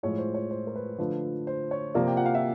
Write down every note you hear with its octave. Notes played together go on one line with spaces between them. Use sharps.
A2 F3 G#3 C#5
C5
C#5
C5
A#4
B4
D3 F3 A3 B4
C5
C#5
C3 F3 A#3 D5
G5
F#5
F5
E5